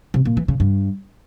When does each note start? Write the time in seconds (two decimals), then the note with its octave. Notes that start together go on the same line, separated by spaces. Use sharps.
0.14 C3
0.25 A#2
0.37 E3
0.48 C#3
0.60 G2